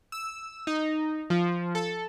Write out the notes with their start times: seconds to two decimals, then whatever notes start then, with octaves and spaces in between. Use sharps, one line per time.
0.12 E6
0.67 D#4
1.30 F3
1.75 A4